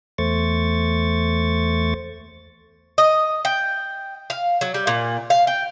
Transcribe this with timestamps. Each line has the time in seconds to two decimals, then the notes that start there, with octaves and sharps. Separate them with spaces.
0.18 E2 A3 C5 C#6 A6
2.98 D#5
3.45 G5
4.30 F5
4.61 F#3
4.74 G3
4.87 A#2
5.30 F5
5.47 G5